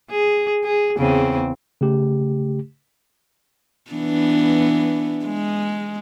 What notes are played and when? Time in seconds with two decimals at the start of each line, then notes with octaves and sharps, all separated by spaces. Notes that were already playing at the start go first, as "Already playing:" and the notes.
0.11 G#4
0.64 G#4
0.98 E2 C#3 C4
1.81 C#3 A3 G4
3.91 E3 B3 D4
5.26 G#3